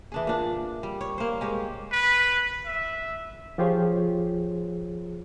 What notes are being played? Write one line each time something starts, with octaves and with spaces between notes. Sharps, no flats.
E3 D4 G#4
A#2 D4
G3
C#5
A#3 C5
G#3 G4 C#5
B4
E5
F3 F4 G4 G#4 C5 C#5